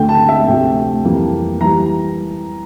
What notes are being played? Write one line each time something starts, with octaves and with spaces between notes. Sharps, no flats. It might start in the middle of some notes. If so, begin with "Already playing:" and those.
Already playing: D2 D3 A3 G5
A5
E5
D2 C3 F3 A3 G5
F2 E3 G3 A#3
E3 G3 A#5